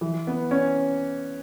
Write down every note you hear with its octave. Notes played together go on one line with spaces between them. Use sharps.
E3
B3
C#4